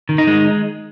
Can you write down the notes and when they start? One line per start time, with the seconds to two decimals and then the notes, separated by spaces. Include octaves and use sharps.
0.09 D#3
0.18 D#4
0.27 G#3